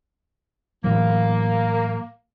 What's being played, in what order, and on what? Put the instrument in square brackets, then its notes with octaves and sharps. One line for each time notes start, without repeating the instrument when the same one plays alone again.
[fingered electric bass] A2 E3 F#3 [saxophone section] A#3